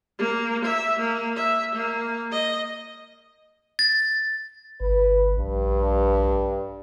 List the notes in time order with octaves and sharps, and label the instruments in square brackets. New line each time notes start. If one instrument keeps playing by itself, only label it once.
[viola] A#3
E5
A#3
E5
A#3
D#5
[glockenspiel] A6
[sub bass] G1 [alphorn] B4
[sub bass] A#1 [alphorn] G2